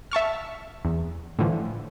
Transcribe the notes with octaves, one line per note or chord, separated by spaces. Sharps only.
E5 A5 C#6 F6
E2
A2 D3 E3 F3